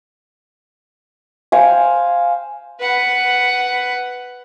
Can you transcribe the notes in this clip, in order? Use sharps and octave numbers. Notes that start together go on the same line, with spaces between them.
C5 F5 G5 G#5
B4 F#5